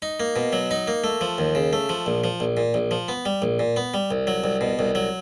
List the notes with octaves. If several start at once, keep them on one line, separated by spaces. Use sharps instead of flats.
D#4
A#3
B2
F#3
D#4
A#3
A3
F3
D#2
C#3
A3
F3
A#1
F3
A#1
A#2
A#1
F3
B3
G3
A#1
A#2
B3
G3
C2
F#3
C2
B2
C2
F#3